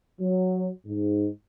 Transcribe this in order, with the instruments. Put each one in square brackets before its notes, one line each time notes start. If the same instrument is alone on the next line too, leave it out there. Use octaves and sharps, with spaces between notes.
[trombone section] F#3
G#2